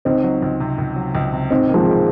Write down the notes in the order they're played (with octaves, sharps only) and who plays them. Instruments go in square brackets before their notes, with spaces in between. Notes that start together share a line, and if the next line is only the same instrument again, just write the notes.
[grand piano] C#2 [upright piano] C4 D#4
[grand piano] F#3
C#2
C3
C#2
F#3
C#2
C3
[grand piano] G#2 [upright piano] C4 D#4
[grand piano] A#3
[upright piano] F3 G#3